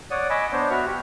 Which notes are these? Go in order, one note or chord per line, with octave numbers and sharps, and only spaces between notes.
C#5 D5 F#5 D#6
D#5 G#5 B5 D6 E6
B3 D4 C5 C#5
B3 F#4 E5 C#6 F6
G4